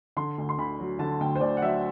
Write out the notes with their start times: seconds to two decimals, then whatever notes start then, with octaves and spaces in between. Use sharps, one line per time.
0.17 D3 C6
0.38 D2
0.49 C6
0.58 D2 B5
0.79 F#3
0.99 D3 A5
1.20 D2 G5
1.35 C5
1.41 D2 D5
1.57 F#5
1.62 F#3 E5